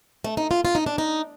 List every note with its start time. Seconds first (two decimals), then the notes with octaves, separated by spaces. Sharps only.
0.24 A3
0.37 D#4
0.51 F4
0.65 F4
0.75 D#4
0.86 D4
0.98 D#4